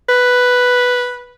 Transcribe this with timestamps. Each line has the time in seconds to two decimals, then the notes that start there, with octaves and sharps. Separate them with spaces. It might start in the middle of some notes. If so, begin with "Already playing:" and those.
0.09 B4